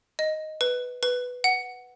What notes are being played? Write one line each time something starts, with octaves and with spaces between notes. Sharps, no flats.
D#5
B4
B4
F#5